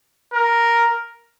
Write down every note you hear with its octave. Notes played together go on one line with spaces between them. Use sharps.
A#4